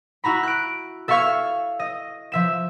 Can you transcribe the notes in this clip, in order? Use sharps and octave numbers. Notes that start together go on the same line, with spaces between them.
E4 F#4 A#5 B5
F#6 D7
A4 E5 F5 C#6 F6 G#6
D#5
F3 E5 E7